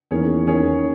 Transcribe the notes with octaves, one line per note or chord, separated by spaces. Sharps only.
E2 D#3 A#3 C#4 G#4 C#5
D#3 A#3 C#4 G#4 C#5